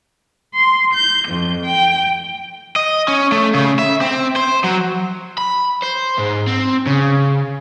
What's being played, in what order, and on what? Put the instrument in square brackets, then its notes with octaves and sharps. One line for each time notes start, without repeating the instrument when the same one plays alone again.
[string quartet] C6
G6
F2
G5
[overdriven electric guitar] D#5
C#4
A3
C#3
E5
C4
C5
F#3
B5
C5
G#2
C4
C#3